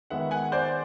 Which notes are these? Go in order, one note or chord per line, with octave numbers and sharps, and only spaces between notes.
D#3 G#3 B3 E5 F#5
F#5 G#5
C5 D5